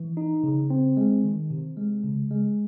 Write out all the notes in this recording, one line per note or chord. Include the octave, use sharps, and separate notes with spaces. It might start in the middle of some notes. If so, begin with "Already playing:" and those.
Already playing: E3
D#4
C#3
C4
G#3
D#3
C3
G#3
C#3
G#3